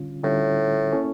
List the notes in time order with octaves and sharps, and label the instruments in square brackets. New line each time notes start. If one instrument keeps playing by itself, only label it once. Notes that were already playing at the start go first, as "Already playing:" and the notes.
Already playing: [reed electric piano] D3 G3 C#4 F4
[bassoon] A2 [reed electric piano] D3 G3 C#4 F4
[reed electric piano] A#3 C#4 E4 A4 C#5